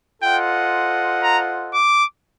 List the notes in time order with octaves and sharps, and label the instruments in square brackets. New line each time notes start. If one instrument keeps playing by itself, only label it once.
[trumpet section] F4 A4 C5 D#5 F#5 [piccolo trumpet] G5
[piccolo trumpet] A#5
D6